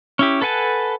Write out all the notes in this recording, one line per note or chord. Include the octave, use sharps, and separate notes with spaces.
C#4 E4 G4
A4 B4 F#5 G#5 A5